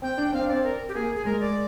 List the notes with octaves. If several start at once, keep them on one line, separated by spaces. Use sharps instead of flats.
C4 G5
D4
C4 F5
D4
C4 D5
A#4
G4
A#3 G#4
G#4
G#3 A#4
D5